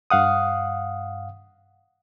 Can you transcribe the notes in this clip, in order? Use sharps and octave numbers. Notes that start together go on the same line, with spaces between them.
G2 F5 F#5 D#6